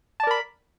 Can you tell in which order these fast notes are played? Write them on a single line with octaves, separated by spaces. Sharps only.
A5 D5 A#4 B5